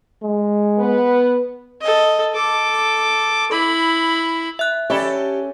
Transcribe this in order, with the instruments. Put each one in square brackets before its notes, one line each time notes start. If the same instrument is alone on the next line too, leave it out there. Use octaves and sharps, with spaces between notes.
[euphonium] G#3
[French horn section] B3 B4
[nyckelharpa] A4 D#5
A4 D6
E4 B5
[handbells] E5 F#6
[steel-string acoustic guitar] C#4 [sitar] G4 A4 [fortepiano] C#5 D5 B5